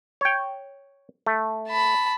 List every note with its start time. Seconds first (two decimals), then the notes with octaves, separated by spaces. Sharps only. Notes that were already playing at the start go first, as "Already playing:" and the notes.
0.21 C#5 G5
1.26 A3
1.68 A5 B5